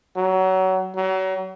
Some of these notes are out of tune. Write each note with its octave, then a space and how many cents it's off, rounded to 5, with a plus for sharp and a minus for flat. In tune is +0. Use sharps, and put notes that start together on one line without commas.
F#3 +25
F#3 +35